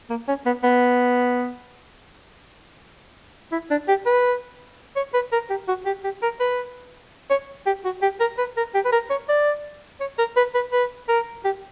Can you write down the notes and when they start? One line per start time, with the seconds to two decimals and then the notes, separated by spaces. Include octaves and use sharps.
0.10 A#3
0.28 C#4
0.46 B3
0.63 B3
3.52 E4
3.70 D4
3.88 G4
4.06 B4
4.96 C#5
5.14 B4
5.32 A#4
5.50 G4
5.68 F#4
5.86 G4
6.04 G4
6.22 A#4
6.40 B4
7.30 C#5
7.66 G4
7.84 F#4
8.02 G4
8.20 A#4
8.38 B4
8.57 A#4
8.74 G4
8.85 B4
8.92 A#4
9.10 C#5
9.28 D5
10.00 C#5
10.18 A#4
10.36 B4
10.54 B4
10.72 B4
11.08 A#4
11.45 G4